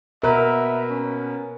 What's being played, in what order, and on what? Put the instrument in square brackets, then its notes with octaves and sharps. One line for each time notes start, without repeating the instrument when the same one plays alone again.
[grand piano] B2 B4 [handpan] A#4 [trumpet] E5
[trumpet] C#4